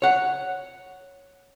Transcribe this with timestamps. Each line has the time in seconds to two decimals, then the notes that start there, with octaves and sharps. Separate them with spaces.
0.02 C#5 F#5